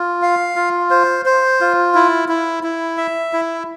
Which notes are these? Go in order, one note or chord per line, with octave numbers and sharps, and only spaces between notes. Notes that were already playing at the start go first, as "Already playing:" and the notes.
Already playing: F4
F5
F4
C5
C5
F4
E4
E4
E4
E5
E4